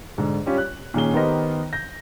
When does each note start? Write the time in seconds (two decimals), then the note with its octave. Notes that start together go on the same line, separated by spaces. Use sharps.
0.18 G#2 D3
0.46 G3 C#4 F4 G4
0.58 F#6
0.94 A#2 D#3 C#4 G#4 G7
1.13 D#3 B3 G4 A#4 C5 D#5
1.73 G6 A#6